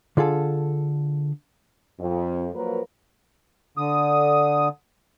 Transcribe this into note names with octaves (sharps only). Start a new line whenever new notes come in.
D3 F4 G#4 A4
F2
F3 F#3 A#3 A#4 B4
D3 D#6